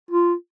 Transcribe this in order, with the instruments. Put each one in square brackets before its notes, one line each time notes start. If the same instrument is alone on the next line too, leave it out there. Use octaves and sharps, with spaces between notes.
[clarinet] F4